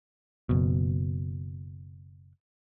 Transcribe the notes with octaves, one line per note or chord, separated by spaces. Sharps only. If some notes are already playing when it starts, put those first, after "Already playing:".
F#1 B2